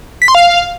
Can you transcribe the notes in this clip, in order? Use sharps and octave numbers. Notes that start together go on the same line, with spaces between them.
B6
C6
F5